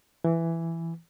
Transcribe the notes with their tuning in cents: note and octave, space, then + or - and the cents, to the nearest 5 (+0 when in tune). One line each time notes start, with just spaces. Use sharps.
E3 +10